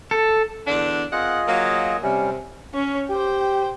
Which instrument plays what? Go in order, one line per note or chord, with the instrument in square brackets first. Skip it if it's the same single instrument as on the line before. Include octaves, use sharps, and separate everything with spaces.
[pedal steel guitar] A4
[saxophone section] E2 D3 D4
[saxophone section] C4 A#4 F#5 [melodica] F4 G#4 D#5
[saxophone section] F#3 A#3
[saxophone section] C3 [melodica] G3 C#4
[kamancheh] C#4 C#5
[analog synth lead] G4 [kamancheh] C5 G5